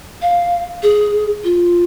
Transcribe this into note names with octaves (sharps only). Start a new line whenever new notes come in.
F5
G#4
F4